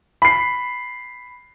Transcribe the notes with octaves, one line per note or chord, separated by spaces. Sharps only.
B5 C7